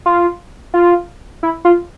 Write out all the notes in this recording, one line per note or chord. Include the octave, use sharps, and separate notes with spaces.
F4
F4
E4
F4